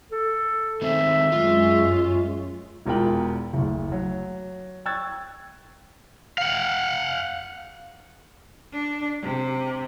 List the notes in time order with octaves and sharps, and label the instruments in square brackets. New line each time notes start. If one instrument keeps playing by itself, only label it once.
[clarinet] A4
[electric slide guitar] D#3 A3 C4 [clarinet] E5
[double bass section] F#2 G#3 C#4 [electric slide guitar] F4
[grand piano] E1 E2 F4 A#4 G5 F#7
F#1 D2
F#3
G5 C#6 E6 F#6 G#6 A6
[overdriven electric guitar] F5 F#5
[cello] D4
C3